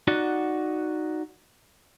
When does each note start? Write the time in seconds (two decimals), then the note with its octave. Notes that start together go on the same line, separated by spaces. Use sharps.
0.07 D#4 F#4 D5 F#5